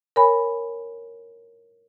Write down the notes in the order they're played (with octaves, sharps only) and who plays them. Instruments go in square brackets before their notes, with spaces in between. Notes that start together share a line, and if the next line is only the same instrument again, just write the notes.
[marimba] A#4 C#5 G#5 B5